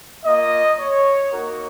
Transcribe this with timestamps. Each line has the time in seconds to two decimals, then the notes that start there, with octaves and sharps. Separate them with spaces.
0.24 A#3 F4 D#5
0.79 C#5
1.32 A#3 D#4 F#4 A#4